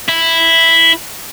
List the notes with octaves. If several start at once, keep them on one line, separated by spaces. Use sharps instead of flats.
E4